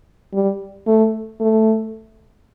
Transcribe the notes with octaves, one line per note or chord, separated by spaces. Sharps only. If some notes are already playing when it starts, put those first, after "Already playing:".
G3
A3
A3